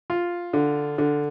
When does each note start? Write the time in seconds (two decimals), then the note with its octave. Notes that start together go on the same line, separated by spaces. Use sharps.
0.10 F4
0.53 D3
0.98 D3